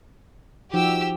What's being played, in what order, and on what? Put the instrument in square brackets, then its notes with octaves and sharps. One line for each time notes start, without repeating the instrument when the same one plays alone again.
[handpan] F3 D#4 F#4 [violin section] G4 E6